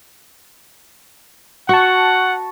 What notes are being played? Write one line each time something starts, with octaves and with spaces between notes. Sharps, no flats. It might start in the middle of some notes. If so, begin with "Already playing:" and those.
F#4 F#5 A5 C#6